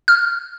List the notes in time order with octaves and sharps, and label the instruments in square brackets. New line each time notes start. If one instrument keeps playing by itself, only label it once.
[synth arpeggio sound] F6